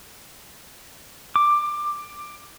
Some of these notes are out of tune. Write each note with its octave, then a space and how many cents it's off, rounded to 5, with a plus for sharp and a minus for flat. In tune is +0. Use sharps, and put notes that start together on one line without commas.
D6 +15